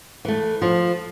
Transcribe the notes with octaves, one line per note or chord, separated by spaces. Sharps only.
E3 A3
F3